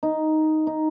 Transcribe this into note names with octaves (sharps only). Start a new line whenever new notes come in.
D#4
D#4